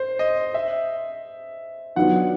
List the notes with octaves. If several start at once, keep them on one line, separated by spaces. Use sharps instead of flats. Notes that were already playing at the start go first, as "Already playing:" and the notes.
Already playing: C5
D#5
E5
D#3 F#3 B3 D4 F4 F#5